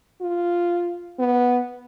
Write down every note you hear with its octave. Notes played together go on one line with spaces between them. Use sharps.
F4
B3